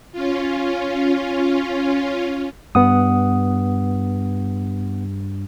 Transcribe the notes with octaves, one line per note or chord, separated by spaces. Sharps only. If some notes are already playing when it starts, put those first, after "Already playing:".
C#4 F4
G2 B3 F#5 D#6